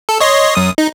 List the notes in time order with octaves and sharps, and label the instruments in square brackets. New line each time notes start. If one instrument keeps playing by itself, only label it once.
[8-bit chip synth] A4
C#5 D#5 C6
F#2 D#6
D#4